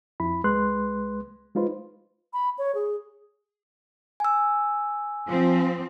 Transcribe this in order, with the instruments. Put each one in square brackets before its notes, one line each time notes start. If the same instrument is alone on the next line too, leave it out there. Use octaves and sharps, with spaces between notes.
[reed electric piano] F2 E4 B5
C2 G#3 B4 C6 F#6
G#3 D#4 F4 B4 C5
[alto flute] B5
C#5
G#4
[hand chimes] G#5 E6
[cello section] F3 C4